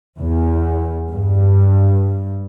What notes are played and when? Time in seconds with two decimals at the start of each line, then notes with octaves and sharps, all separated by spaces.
0.18 E2
1.08 G2